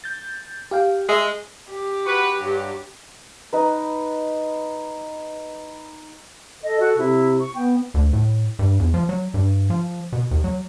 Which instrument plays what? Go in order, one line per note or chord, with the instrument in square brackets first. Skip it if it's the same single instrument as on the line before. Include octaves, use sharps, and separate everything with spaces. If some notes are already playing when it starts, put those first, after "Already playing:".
[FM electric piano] G6 A6
G4 F5 G5
[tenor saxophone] G#3 [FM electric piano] E5 E6
[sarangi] G4
[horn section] F#4 B4
G2 F#3
[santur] D#4 B4
[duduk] A4 [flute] D#5
[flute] F#4
[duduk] C3 [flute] E4
[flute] C#6
[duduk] B3 [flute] G5
[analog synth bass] D2
A2
G2
E2
F3
F#3
G2
F3
B2
D#2
F#3